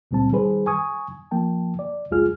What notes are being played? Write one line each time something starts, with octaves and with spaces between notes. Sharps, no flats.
C#2 A#2 G3 C4 A5
D#3 G3 G#4 B4 C5
G#5 C#6 D#6 G#6
F3 A#3 G5 A5
D5
C2 F2 G#3 F4 G#4 F6